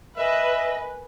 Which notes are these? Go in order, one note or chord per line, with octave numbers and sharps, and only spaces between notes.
A#4 B4 D#5 E5 G#5